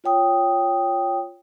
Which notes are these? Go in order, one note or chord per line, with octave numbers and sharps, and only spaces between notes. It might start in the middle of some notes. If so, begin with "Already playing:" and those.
F4 C#5 G5 D#6